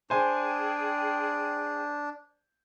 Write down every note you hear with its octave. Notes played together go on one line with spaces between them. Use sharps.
D4 G#4 C5 G5 G#5